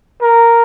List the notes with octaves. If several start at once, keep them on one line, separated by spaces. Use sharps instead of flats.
A#4